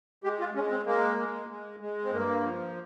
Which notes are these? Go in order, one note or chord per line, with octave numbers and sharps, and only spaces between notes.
G#3 G4
F4
G#3 C#4
C4
G#3 A#3
G#3
G#3
G#3
C4
G2 A#3
F3